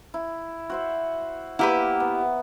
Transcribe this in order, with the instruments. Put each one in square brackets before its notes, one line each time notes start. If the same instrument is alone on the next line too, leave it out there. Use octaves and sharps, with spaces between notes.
[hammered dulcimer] E4
F#4 C5 E5
[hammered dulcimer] A#3 B3 [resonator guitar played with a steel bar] E4 G4 B4 [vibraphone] F#5
[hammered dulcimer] B3